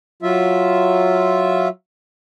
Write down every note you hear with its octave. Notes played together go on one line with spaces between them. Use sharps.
F#3 F4 E5